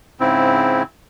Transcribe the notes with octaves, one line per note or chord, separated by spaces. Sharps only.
G#2 C#3 C4 E4